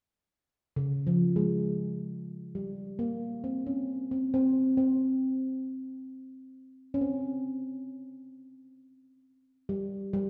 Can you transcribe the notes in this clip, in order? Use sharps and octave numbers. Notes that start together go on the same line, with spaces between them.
C#3
F3
G#3
G3
A#3
C4
C#4
C4
C4
C4
C#4
C4
G3
G3